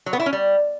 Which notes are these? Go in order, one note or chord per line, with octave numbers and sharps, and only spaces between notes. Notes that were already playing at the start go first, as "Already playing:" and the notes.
F#3
B3
E4
C#4
G3